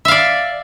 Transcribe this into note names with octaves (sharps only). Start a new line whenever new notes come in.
D5 E5 F5